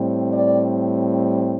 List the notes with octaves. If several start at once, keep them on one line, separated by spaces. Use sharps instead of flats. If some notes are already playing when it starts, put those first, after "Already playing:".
Already playing: A2 G3 C4
D5